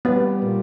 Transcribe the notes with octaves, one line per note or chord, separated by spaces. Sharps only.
G3 B3
A#2